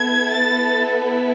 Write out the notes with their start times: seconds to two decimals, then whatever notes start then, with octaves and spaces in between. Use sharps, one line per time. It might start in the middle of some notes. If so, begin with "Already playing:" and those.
Already playing: B3 E4 A4 G#6
0.31 A6